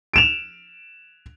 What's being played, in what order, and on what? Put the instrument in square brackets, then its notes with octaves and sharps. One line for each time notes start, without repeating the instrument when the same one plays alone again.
[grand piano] D7 E7 F7